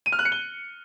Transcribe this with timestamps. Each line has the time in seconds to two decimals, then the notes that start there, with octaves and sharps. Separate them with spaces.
0.06 D#7
0.12 F6
0.19 F#6
0.25 C#7
0.32 G7